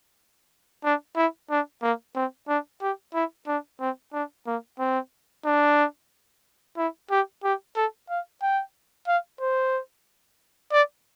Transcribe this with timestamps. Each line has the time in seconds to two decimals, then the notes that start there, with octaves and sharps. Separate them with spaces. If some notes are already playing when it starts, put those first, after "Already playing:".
0.84 D4
1.16 E4
1.50 D4
1.82 A#3
2.15 C4
2.48 D4
2.81 G4
3.14 E4
3.47 D4
3.80 C4
4.13 D4
4.46 A#3
4.79 C4
5.45 D4
6.77 E4
7.10 G4
7.43 G4
7.76 A4
8.09 F5
8.42 G5
9.07 F5
9.40 C5
10.72 D5